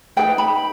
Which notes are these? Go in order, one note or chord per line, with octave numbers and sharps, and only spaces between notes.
D#4 G#4 B4 G5
B5